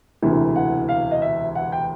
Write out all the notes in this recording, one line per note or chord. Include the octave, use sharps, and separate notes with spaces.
E1 D2 C3 E3
F#5
F5
D#5
E5
F#5
G5